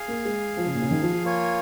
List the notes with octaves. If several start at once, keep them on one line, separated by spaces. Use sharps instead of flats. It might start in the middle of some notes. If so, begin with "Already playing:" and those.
Already playing: G#4 F5 G#5
A#3
G#3
F3
C#3
A#2
C#3
D#3
F3
F3
A#3 F4 C#5 G#5